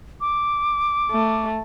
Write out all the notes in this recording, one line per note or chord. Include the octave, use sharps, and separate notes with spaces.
D6
A3